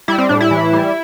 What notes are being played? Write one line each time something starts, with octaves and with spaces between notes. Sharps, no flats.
G3 E4
C4
A2 D4
E4
E3
G3